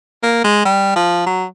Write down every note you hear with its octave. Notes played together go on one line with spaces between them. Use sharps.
A#3
G#3
G3
F3
F#3